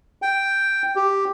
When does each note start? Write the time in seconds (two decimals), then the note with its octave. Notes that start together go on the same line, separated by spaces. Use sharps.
0.22 G5
0.96 G4